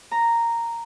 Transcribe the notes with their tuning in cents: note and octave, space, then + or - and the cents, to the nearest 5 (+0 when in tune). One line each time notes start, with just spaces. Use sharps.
A#5 -5